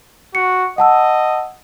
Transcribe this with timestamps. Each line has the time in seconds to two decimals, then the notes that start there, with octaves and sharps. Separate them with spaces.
0.35 F#4 C#7
0.78 D#5 F#5 A5 E6